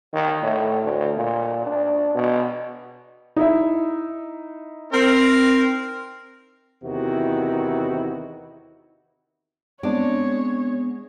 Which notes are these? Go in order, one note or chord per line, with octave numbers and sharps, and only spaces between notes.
D#3
A2
D2
A#2
D4
B2
D#4 E4 E5
C4 A#4
E2 C3 D#3 E4 F#4
G#3 B3 C4 D4 C#5 D5